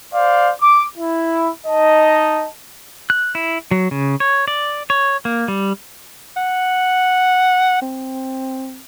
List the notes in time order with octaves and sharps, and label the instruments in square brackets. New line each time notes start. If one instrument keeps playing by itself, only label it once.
[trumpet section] C5 D5 F5
D6
E4
D#4 D#5 A5
[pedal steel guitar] F#6
E4
F#3
C#3
C#5
D5
C#5
A#3
G3
[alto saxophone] F#5
C4